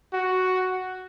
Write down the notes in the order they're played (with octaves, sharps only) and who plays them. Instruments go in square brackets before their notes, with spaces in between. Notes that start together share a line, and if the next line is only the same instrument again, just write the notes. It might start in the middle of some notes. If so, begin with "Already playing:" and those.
[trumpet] F#4